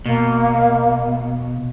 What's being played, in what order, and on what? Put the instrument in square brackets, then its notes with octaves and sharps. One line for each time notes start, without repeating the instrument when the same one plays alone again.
[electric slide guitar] B2 [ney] A#3